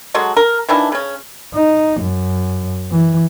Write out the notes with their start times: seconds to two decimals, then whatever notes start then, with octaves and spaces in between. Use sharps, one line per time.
0.14 F#3 G#3 F#4 A4
0.37 A#4
0.69 D#3 E3 D4 E4
0.92 C#3 C#4
1.55 D#4
2.00 F#2
2.91 E3